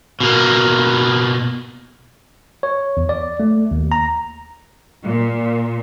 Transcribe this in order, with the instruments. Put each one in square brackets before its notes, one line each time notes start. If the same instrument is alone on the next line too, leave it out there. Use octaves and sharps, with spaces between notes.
[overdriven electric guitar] B2 A#3
[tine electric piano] C#5
E2
D5
A3
D#2
A#5
[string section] A#2